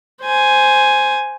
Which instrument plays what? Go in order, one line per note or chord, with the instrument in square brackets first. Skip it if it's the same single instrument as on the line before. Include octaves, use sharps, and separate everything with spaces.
[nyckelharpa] C5 G#5